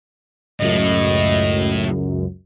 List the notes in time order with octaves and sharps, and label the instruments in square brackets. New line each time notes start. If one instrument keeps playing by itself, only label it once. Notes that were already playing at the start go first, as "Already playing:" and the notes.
[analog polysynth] C#2 F#2 [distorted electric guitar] A2 [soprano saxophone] D#5